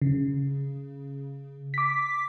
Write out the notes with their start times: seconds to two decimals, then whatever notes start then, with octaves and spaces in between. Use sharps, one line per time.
0.02 C#3
1.74 D6 B6